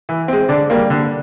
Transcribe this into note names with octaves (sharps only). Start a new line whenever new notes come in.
E3
G#3 C4
D3 D5
G3 A#3
D3